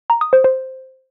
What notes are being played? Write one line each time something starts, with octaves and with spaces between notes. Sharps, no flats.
A#5
D#6
C5
C5